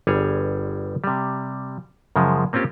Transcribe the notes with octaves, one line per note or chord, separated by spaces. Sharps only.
G1 G3 G#4 C#5
C3 G3
F#2 C#3 F3 G#3
A#3 C4 C#4 F4 G4